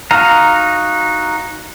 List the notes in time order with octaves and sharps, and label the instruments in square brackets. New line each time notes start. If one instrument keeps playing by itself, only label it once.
[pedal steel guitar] D#4 F#4 F5 A#5